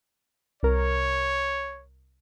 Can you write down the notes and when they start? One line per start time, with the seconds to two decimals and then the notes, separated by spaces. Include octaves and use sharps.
0.63 C2 A#4 C#5